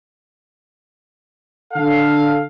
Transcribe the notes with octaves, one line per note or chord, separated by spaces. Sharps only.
D3 A4 F5